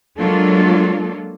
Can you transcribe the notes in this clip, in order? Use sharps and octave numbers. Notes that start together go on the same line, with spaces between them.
F#3 G#3 A#3 D4 F4 A4